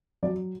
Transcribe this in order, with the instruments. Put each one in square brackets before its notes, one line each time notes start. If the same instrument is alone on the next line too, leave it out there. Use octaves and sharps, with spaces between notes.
[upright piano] F#3 D5